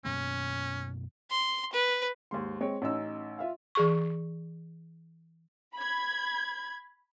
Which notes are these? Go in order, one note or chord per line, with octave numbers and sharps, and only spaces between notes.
F#2 B2 A#3 C#4
C6
B4
D#2 G#2 C6
G#3 C4 C#5
A1 C#4 D#4 E6
F4 E5 F5
E3 G#4 C#6
B5 G#6